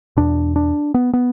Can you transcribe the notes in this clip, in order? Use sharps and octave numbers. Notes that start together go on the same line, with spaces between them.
E2 B2 D4
D4
B3
B3